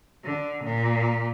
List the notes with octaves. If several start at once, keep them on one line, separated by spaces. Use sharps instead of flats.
D3
A#2